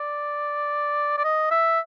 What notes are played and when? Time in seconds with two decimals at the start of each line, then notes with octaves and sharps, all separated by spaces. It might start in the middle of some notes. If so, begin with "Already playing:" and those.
Already playing: D5
1.18 D5
1.24 D#5
1.51 E5